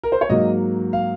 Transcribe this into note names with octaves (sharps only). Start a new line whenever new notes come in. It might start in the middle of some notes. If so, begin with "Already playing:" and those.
A#4
C5
C#5
G#2 F#3 A#3 D#5
F5